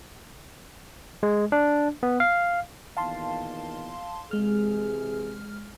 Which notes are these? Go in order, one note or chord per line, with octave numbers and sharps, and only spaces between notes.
G#3
D4
B3
F5
E2 A#2 D#3 F5 A5 C6
C3 E3 G#3 G#4 F6